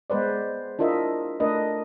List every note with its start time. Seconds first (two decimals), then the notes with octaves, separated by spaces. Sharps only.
0.10 G#3 B3 B4 C5 D5
0.79 D4 E4 F4 A#4 D#5 E5
1.40 A3 D4 A#4 B4 D#5